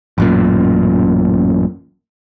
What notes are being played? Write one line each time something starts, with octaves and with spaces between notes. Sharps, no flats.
A1 F#2 A#2